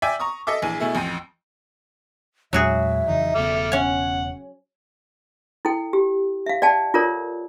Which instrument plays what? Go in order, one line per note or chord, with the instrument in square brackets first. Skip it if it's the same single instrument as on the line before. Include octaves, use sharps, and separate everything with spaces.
[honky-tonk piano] D5 E5 G5 G#5
A#5 C#6 D#6
A4 D#5 E5 D6
A#1 E3 G#4 G#5
B2 A3 E4 G#4
A1 F2 G5 D#7
[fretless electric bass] E2 A#2 G#3 [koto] F#3 F#4 G#4 [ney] E5
[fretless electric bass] F2 C#3 E3 [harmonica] D#4
[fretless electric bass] E1 C#3 B3 [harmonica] A4 D6 F6
[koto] C#4 C#5 [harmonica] F#5
[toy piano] E4 A4 G5
G4
E5 F5
D5 F5 G5 A5
F4 A4 A#4 C#5 D5